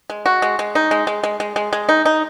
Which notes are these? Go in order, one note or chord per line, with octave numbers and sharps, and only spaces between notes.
G#3
F#4
G#3
G#3
D#4
G#3
G#3
G#3
G#3
G#3
G#3
D#4
D#4